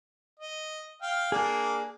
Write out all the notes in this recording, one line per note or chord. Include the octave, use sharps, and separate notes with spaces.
D#5
F5 G5
A#3 D4 G#4